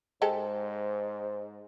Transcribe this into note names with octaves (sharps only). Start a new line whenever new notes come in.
G#2 G#3 G4 A4 C5